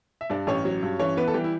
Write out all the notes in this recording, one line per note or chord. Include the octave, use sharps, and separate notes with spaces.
E5
G2 D4 D5
A1 C#4 C#5
F#3
G2
E3 C#4 C#5
E3 B3 B4
A4
E3 G3 G4
E4